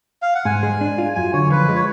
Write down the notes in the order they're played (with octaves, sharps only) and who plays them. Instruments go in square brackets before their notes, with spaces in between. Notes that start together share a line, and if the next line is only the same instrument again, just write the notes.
[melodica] F5
F#5
[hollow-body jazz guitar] G#2 [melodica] G#5
[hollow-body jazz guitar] G#3
D4
F4
[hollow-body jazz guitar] F#2 [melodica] G#5
[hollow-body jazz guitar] D3 [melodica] C#5
[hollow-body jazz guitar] F3 [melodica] B4
[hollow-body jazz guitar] G#3
[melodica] C#5